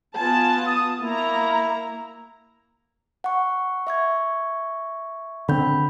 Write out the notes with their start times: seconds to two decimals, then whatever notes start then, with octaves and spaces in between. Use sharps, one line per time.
0.15 B3 F4 G#5 A5
0.66 D#6
1.02 A#3 E4 A#5
3.24 F#5 C#6
3.87 E5 C#6 G#6
5.49 D3 C4 B5 G6